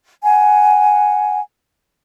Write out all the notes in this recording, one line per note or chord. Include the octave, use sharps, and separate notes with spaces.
F#5 G#5